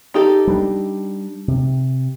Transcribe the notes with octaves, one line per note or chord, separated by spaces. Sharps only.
D#4 G4 A4
G3 D4
C3